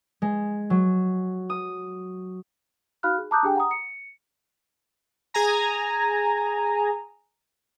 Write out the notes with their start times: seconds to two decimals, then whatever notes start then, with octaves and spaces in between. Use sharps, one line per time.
0.22 G#3
0.70 F#3
1.50 D#6
3.03 D#4 F#4 F5 B5 F6 F#6
3.18 G#4
3.31 A5 A#5 D6 D#6 F#6 G6
3.43 D4 G4 G#4 G5 G#5
3.55 F#5 A#5 D#6
3.71 C#7
5.34 G#4 G#5 A#5